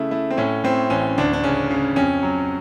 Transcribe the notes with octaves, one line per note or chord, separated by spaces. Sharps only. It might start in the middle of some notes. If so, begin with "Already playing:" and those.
Already playing: C#3 A3 E4
A3 E4
C4
A2 C#4
A2 C4
A1 C#4
D2 D4
D4
C#3 C#4
C#3
F2 C#4
F#3